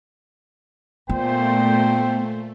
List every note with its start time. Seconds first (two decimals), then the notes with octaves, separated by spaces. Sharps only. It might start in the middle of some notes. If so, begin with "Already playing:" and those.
1.09 A#2 A3 B3 C5 G5